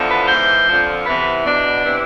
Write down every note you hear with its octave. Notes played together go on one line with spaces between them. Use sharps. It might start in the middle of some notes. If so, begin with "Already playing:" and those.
Already playing: E2 D3 F3
B4
G#2 E3 C5
F2 D3 F3
E2 C3 E3 B4
E2 B2 D4
C3 E3